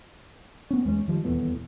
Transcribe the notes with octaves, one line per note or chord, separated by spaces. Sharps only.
B3 C#4
E2 G#3 A3 C#4
D#3 F3 G3
D#1 E2 A2 B3